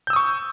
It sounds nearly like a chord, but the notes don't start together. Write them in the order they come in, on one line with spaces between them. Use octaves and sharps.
G6 E6 D#6 C#6